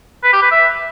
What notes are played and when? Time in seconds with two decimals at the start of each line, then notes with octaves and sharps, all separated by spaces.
0.23 B4
0.33 G4
0.42 B4
0.51 E5